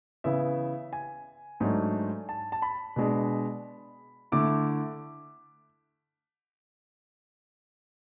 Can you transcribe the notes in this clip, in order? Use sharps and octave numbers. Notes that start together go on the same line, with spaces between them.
C#3 E3 B3 E4 E5
G#5
G#2 F#3 A3 D4
A5
A5
B5
B2 G#3 D4
D3 A3 E4 D6